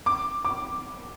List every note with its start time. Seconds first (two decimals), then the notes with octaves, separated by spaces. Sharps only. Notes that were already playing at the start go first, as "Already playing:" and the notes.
0.06 D6
0.45 D6